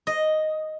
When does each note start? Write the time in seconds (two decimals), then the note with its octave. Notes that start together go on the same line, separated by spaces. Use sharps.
0.07 D#5